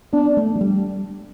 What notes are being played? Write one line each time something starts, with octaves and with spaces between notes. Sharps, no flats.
B3 D4
A3
F#3
G3